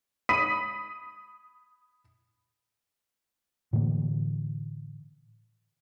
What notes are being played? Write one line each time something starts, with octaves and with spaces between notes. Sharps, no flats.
B5 D#6 B6 D#7
A2 D3 E3 A#3